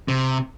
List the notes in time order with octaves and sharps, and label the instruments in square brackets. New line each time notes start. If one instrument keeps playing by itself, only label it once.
[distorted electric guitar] C3